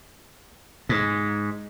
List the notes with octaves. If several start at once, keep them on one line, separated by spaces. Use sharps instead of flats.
G#2